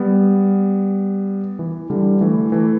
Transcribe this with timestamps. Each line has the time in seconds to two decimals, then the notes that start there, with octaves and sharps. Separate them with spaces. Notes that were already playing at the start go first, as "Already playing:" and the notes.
Already playing: G3 B3
1.59 E3
1.90 D3 G3
2.21 E3 A3
2.52 E3 A3